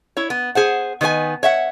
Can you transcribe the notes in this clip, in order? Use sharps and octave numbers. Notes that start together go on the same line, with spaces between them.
E4 C#5
B3
G#4 C5 F#5
D#3 B3 B4 C5 G#5
C#5 E5 F#5